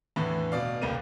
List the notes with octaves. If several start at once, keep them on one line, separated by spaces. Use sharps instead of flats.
E2 A2 D3 E3
B2 D5 F5
D#1 C2 A#3 D#7